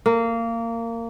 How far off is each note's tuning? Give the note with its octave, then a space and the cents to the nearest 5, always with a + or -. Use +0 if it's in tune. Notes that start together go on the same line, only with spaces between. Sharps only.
A#3 -20